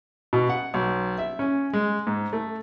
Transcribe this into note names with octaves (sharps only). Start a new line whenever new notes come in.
B2
F#5
B1
E5
C#4
G#3
G#2
A3